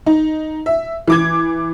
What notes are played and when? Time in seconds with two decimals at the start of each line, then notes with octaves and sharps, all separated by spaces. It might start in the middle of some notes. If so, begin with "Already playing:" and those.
0.06 D#4
0.66 E5
1.08 E3 D6 G#6